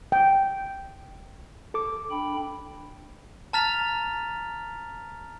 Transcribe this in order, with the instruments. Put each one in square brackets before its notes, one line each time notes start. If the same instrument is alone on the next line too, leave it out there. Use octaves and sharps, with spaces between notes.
[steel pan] G5
[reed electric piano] A4 D6
[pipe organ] D4 G5 B5
[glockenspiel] A5 A#5 F6 A6 B6 F7